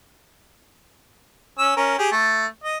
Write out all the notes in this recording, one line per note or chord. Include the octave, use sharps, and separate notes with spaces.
C#4 E6
C#4 A#4
G4 G#4
A3
D#5